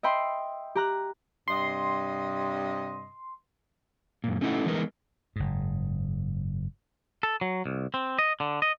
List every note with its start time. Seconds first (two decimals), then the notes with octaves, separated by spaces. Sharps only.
0.03 D#5 E5 G5 B5 C6
0.75 G4 A#5 F#6
1.48 G2 C3 D#5 C6
4.24 F#2 A#2
4.41 A3 C#4 D#4 E4 A4 F#5
4.66 E3 G#3 B3 D#4 A#4
5.36 F#1 G#2
7.23 A4
7.41 F#3
7.66 C2
7.94 C4
8.19 D#5
8.40 D3
8.62 D#5